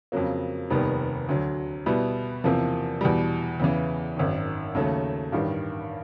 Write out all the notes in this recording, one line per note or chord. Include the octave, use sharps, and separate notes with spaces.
F2 C#3 F#3 A#3
F1 D#2 D#3 G3 B3
D2 D3 F#3
B2 G3 B3 E4
E2 C3 F3 A#3
E2 B2 G3
E2 C#3 E3
G#1 F#2 D#3
D#2 C#3 F#3 A3 C#4
A1 G2 D#3 G3